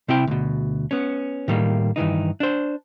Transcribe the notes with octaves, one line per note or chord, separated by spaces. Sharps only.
C3 C4 E4 G5
D2 B2
B3 C#4
A2 D#3 G3 A#3
G2 D#3 E3 D#4
D4 C5